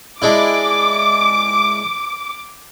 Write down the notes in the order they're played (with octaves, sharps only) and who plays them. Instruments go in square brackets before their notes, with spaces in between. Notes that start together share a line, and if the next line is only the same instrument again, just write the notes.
[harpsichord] G#3 D4 E4 [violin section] D6